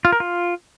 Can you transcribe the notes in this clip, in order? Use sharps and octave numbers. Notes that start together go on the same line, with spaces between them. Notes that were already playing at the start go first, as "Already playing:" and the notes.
F4
A#4
F4